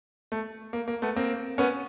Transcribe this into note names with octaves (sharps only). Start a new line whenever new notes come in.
A3
A#3
A#3
A3 B3
A#3 C4
B3 C#4